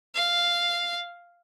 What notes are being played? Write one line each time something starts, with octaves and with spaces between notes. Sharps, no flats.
F5